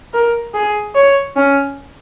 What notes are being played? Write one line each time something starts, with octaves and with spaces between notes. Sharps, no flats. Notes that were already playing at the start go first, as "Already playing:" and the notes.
A#4
G#4
C#5
C#4